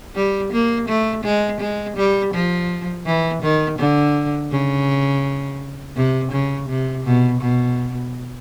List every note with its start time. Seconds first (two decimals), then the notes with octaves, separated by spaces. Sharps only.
0.16 G3
0.53 A#3
0.88 A3
1.24 G#3
1.61 G#3
1.97 G3
2.34 F3
3.06 E3
3.43 D#3
3.79 D3
4.51 C#3
5.96 C3
6.32 C#3
6.69 C3
7.05 B2
7.41 B2